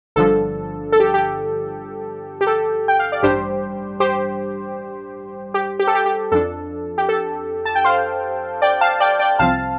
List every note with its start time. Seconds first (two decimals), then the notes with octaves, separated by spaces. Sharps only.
0.16 G1 G2 D3 F3 D4 A4
0.92 A4
1.00 G4
1.14 G4
2.41 G4
2.47 A4
2.88 G5
2.99 F5
3.12 D5
3.23 A1 G2 G3 D4 G4 C5
4.00 G4 C5
5.54 G4
5.80 G4
5.87 A4
5.95 G4
6.06 G4
6.32 F2 F3 D4 A4
6.98 G4
7.09 A4
7.65 A5
7.75 G5
7.85 C5 F5
8.62 D5 G5
8.81 F5 A5
9.00 D5 G5
9.19 D5 G5
9.39 C2 C3 F3 C4 F5 A5